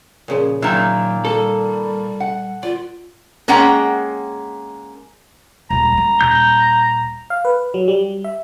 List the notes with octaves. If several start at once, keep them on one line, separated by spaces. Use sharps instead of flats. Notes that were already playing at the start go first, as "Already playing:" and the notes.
A#2 C#3 F3
A#2 D#3 F#3 E4
G3 A4
F#5
F4 D5
G#3 A#3 C#4 F#5 G5 A#5
D#1 G#3 A#5
G#3 C#4
D#1 G6
F5
B4
F#3
G3
E5